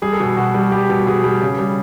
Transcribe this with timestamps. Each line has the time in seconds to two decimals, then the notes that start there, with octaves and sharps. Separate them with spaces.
0.02 G3 G#4
0.12 A4
0.20 B2 G#4
0.37 B2 F#4
0.54 G3
0.72 G3 G4
0.89 B2
1.07 B2 G#4
1.24 G3
1.41 C#3
1.59 G3